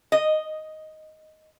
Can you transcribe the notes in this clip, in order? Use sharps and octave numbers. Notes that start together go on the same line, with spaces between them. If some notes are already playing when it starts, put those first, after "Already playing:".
D#5